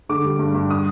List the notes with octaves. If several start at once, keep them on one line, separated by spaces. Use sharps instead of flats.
D3 D6
G3
G2
G2
D#6